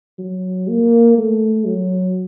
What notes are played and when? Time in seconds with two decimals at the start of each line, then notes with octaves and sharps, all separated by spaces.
0.18 F#3
0.69 A#3
1.18 A3
1.66 F#3